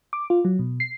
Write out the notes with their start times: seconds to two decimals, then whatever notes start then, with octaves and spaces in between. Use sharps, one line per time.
0.13 D6
0.30 F4
0.45 F#3
0.59 B2
0.80 C7